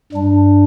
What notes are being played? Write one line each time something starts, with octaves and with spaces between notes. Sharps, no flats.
G2 G3 D4